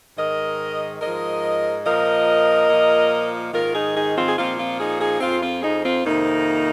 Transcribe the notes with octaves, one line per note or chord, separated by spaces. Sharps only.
G#2 D#3 A#4 D#5
G#2 F3 A#4 D#5
A#2 F3 A#4 D#5
A#2 F3
G#2 D#3 F4 A#4
D#4 G#4
D#4 G#4
C4 F4
G#4
A#2 F3 C4 F4
C4 F4
D#4 G#4
D#4 G#4
F2 F3 C4 F4
C4 F4
D#4 G#4
C4 F4
F2 C3 D#3 A#3 D#4